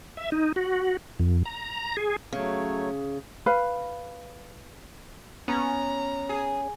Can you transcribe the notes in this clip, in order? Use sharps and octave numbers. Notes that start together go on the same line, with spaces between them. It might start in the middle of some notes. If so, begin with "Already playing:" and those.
E5
D#4
F#4
F2
A#5
G#4
C#3 F#3 A3 C#5
B4 F5 B5
B3 C#4 A#5
G#4